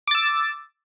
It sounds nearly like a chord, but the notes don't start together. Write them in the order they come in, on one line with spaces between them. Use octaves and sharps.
D6 A6 E6